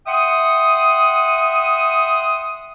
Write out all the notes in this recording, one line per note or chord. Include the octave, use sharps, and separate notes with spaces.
E5 F#5 G5 C6 D#6